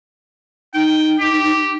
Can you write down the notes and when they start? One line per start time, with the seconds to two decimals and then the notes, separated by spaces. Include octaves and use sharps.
0.74 D#4 G5
1.19 G4